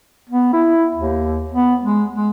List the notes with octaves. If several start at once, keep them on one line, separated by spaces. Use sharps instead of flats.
B3
E4
D#2
B3
G#3
G#3